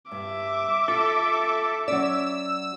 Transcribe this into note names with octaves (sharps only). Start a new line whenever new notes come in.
G2 E5 D6
F4 A4
F#3 C#4 D5 E6